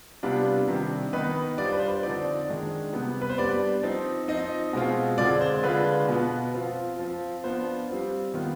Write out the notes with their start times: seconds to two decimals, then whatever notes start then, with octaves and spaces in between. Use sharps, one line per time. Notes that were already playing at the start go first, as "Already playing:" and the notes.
0.23 C3 G3 B3 D4 F4
0.68 C3 D#3 G3 D4
1.13 D#3 B3 D#4 B4
1.58 G3 D4 F4 D5
1.65 C5
1.72 B4
1.79 C5
2.03 D3 F3 C4 D#4 D5
2.48 D#3 G#3 D4
2.93 C3 G3 B3
3.22 B4
3.30 C5
3.38 G3 B3 D4 D5
3.83 F3 C4 D#4
4.28 F3 C4 D#4 D#5
4.73 B2 G#3 C4 F4
5.18 D3 G#3 C4 F4 D5
5.41 C5
5.63 D3 G#3 D4 F4 B4
6.08 B2 B3 F4
6.54 F3 C4 F4
6.98 F3 C4 F4
7.44 F3 B3 D4 F4 C5
7.89 G3 C4 F4
8.34 D#3 B3 F4